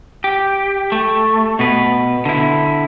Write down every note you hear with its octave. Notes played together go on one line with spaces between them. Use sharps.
G4
A3
B2 B4
D3 E4